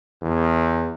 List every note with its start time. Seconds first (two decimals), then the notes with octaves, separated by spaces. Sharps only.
0.22 E2